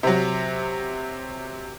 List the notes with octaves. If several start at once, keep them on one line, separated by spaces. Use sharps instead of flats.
C3 F#3